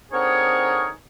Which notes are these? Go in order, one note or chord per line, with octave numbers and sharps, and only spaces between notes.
D3 C4 D#4 G#4 A#4 C#5